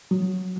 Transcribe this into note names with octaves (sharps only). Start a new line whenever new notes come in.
F#3